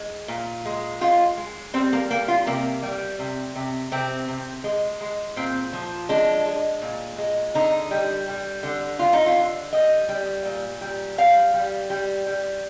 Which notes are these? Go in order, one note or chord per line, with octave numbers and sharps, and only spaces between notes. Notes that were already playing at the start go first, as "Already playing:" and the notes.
Already playing: G#3
A#2
G#3
G#3 F4
G#3
G3 C4
A#3
G3 A#3
F4
C3 A#3
G3
C3
C3
C3 C4
C3
G#3
G#3
A#2 C4
F3
G#3 D4
G#3
A#2
G#3
D3 D#4
G3
G3
D3
D3 F4
D#4
F4
D3
G3 D#5
G3
A#2
G3
G3 F5
G3
G3
G3